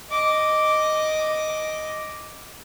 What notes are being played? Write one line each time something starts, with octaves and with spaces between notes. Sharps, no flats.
D#5 D6